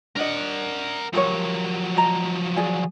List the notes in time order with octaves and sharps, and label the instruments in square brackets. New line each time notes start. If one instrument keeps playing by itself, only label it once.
[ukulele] D4 D#5 [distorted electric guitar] A#4 F#5
[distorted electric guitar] F3 F#3 [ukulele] G4 A#4 C#5
[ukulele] D#5 A5 A#5
G#4 D5 G#5